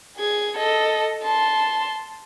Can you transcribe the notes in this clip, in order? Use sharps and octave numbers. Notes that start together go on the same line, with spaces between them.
G#4 G#6
A4 D#5
A5 C6